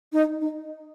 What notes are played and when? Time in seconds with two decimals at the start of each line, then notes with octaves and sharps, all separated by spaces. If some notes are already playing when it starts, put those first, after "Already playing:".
0.13 D#4
0.41 D#4